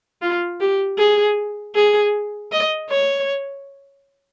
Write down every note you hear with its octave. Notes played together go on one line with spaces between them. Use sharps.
F4
G4
G#4
G#4
D#5
C#5